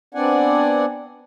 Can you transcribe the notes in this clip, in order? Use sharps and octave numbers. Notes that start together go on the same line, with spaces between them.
B3 C4 D4 D5 F#5 G#5